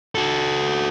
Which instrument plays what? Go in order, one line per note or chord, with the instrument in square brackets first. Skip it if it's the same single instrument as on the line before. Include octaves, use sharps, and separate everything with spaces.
[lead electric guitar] F#4 A4